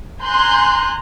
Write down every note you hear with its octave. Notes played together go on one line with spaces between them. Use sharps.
G#5 A#5 C6 F#6 G6